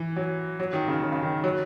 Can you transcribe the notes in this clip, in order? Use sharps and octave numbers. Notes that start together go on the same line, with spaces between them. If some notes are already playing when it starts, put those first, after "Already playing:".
Already playing: E3
F#3
F#3
D#3
C#3
C#3
C#3
D#3
F#3